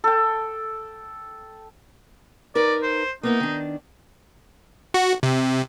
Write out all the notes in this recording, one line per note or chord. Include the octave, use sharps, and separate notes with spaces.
A4 G5
D#4 A#4 B4 D5
C5
A#3 B3 D#4 E4
D#3 D4
F#4
C3